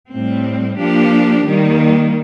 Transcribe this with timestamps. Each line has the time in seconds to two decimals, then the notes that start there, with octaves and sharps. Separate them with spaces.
0.10 A2 G3 C4
0.78 F3 A#3 D4 G4
1.47 D#3 G3 A#3